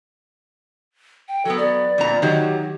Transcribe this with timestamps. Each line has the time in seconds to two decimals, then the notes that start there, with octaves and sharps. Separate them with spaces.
1.28 G5
1.45 F#3 B3 A4
1.58 D5
1.98 F2 A#2 A#5
2.22 D#3 F#3 G4